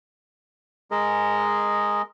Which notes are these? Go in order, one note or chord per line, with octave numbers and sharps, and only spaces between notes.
G#3 G#4 A#4 D#5